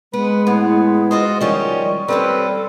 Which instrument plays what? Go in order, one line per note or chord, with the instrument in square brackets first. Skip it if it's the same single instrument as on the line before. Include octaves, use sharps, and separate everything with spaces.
[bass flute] G#3 [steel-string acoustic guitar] B3 [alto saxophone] B4
[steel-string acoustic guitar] A2 [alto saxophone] B3
[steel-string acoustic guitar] F4 F#4 C5 [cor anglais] D#5
[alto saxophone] D#3 [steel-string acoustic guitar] F3 G3 D#5 [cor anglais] C#4
[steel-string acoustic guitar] G3 C#4 G4 [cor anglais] C4 [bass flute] A4 [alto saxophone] B4